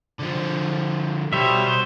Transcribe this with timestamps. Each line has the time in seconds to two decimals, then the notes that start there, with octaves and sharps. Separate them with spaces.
0.19 D3 F3
1.33 B2 G3 C5 C#5 E5
1.66 C5